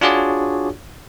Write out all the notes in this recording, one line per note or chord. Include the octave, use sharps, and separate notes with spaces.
D4 F4 F#4 G#4 C#5 D5